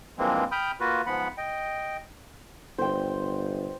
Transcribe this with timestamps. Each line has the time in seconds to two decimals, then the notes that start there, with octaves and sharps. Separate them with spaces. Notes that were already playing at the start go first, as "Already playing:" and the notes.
0.19 G2 E3 F3 G#3 A#3 C4
0.52 G5 B5 D#6 F6 G6
0.80 A#3 F4 F#4 B4
1.06 G#2 F3 B3 F#5 B5
1.37 D#5 G5
2.79 G1 C5 G5